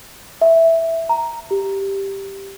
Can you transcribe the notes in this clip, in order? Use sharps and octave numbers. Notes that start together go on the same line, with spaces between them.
E5
A#5
G4